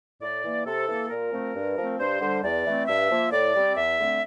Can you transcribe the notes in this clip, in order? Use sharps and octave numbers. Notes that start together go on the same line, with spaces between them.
A2 D5
E3 A#3
C3 A4
E3 A#3
A#2 A#4
F3 A3 C4
G2
F3 A3 C4
G2 C5
D3 G3
E2 D5
E3 A3 C4
G2 E5
F3 A#3
A2 D5
G3 C4
E2 E5
D3 A3 C4